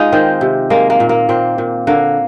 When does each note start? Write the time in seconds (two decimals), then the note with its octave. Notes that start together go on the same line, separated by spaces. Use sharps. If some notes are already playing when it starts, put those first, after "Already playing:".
Already playing: G#3 D#4 F4
0.12 D#3 C4
0.41 C3
0.70 G#3 A#3
0.90 A#3
1.00 A#2
1.09 A#3
1.29 A#2 C4
1.58 A#2
1.87 D3 A#3